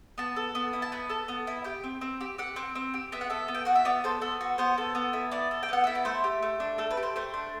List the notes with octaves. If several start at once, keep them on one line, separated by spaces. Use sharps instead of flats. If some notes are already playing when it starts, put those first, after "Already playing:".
B3 A5
A4
B3
E4
A5
B3 B5
A4 A5
B3
E4
G4 G5
C4
C4
G4
G4 F#5
C4
C4
G4
B3 E5
F#5
A4 E5
B3
G5
F#4 F#5
E5
B3 D5
A4 C5
B3 A4
F#4
B3 C5
A4
B3
E4
B3 D5
A4
G5
B3 F#5
E4 E5
D5
A3 C5
G4
A3
D4
A3 A4
B4
G4
C5
A3 C5
D4